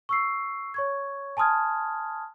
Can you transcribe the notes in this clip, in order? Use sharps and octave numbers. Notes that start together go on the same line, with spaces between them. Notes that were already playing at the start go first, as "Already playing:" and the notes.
C#6 E6 C7
C#5 C#6 G#6
G#5 A5 C6 D#6 F6 G#6